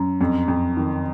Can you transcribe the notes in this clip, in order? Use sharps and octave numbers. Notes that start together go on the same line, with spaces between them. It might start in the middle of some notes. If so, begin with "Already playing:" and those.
Already playing: F#2
F2
F2
D#3